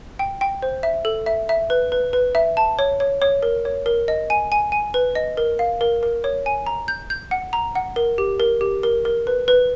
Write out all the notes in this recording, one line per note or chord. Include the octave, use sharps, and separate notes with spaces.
G5
G5
C5
E5
A4
E5
E5
B4
B4
B4
E5
A5
C#5
C#5
C#5
A#4
C#5
A#4
D#5
G#5
G#5
G#5
B4
D#5
A#4
F5
A#4
A#4
C#5
G#5
A#5
G6
G6
F#5
A#5
F#5
A#4
G4
A#4
G4
A#4
A#4
B4
B4